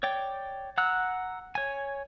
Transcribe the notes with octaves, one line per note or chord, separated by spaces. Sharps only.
C#5 D5 G5
F#5 A#5 E6 F#6
C#5 G#5